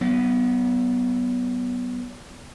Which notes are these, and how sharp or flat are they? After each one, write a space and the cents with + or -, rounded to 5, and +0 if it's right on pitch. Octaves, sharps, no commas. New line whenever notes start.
F#3 +45 B3 +0